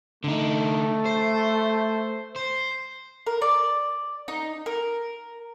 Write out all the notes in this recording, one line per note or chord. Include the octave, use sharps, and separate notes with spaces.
D3 A3 D#4
C5
C5
A#4
D5
D#4
A#4